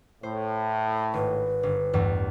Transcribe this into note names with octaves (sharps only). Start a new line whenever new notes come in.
A2 C5
G#1 B4
G1
A1 E2 G2